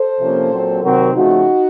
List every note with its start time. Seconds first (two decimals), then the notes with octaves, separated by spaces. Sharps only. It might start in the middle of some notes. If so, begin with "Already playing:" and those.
Already playing: A4 C5
0.19 C3 F3 A#3 C#4
0.51 A#2 F#3 C4
0.82 C3 D#3 F#3 C4 F#4 A#4
1.14 C#3 F3 A3 C4 D#4 F#4